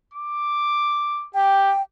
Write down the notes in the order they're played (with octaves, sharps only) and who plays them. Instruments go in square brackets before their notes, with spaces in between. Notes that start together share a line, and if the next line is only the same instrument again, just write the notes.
[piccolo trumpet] D6
[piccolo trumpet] G4 [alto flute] G5